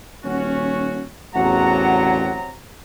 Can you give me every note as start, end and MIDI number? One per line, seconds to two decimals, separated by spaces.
0.24 1.07 27
0.24 1.03 61
0.24 1.03 66
1.35 2.35 33
1.35 2.33 40
1.35 2.50 48
1.35 2.50 54
1.35 2.33 66
1.35 2.33 78
1.35 2.50 82